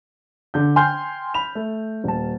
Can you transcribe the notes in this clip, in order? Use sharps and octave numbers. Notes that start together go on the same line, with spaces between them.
D3 G6
G5 G#5 C6 F6 G6
B5 F7
A3
D#1 A5